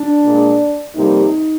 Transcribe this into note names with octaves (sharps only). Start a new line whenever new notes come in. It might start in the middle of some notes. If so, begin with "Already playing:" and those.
Already playing: D4
A#2 G#3
F2 C3 G3 A#3 D#4